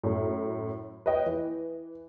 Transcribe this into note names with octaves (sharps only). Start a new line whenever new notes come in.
F#2 A2
B4 C#5 D#5 G5
E3